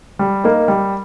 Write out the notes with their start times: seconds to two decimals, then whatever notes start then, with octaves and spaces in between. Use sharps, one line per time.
0.19 G3
0.44 A#3 D#4
0.68 G3